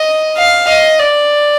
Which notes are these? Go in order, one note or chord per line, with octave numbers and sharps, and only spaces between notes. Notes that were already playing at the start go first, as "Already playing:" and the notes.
Already playing: D#5
F5
D#5
D5